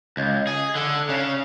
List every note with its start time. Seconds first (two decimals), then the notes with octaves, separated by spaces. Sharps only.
0.17 C#2
0.47 G#4
0.75 D3
1.09 C#3